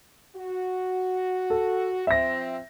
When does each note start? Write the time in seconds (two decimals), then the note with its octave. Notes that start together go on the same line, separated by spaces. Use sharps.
0.35 F#4
1.50 A4
2.07 F3 C4 E5 A#6